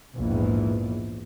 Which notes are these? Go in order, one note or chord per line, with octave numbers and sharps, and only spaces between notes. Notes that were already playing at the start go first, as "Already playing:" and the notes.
A#1 E2 G#2 E3